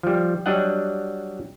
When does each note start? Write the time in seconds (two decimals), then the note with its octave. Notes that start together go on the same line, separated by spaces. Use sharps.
0.03 F3 G3
0.46 F#3 G3 D4 D#5 F#5